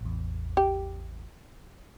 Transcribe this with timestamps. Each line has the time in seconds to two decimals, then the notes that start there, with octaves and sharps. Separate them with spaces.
0.01 A1 E2
0.57 G4